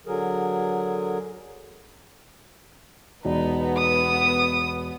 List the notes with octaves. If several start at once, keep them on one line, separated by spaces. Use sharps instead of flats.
D3 F#3 G#4 A#4
E1 B3 D#4
D#6